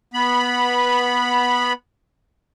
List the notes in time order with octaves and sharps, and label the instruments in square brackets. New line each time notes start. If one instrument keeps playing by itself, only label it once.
[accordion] B3 B5